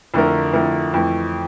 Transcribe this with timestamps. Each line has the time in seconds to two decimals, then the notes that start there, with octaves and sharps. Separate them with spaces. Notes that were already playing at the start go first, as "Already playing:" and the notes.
0.14 F2 D3 A3 E4 A#4
0.53 F2 D3 A3 E4 A#4
0.94 F2 E3 A3